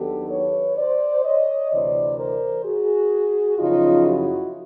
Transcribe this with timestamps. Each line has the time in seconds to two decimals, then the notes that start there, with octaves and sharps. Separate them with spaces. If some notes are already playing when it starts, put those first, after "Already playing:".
Already playing: D#2 D#3 F#3 B3 D4 G4 A4
0.30 B4 C#5
0.77 C5 D5
1.25 C#5 D#5
1.71 D2 C3 E3 C5 D5
2.17 A#4 C5
2.65 F#4 G#4
3.58 F#2 C#3 F3 D#4 F4
4.05 E4 F#4